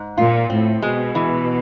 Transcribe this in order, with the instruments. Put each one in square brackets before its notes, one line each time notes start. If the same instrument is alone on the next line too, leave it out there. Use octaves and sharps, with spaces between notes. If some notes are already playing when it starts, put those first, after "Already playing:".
Already playing: [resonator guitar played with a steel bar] G#2
[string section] A#2 [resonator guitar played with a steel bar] F4
[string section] A2 [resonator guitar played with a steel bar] C4
[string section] B2 [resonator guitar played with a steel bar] G#3
[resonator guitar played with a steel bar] E3